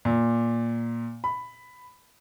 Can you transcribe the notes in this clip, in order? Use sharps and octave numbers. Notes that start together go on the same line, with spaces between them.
A#2
B5